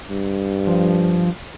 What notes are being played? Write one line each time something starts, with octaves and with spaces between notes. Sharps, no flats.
G2
F3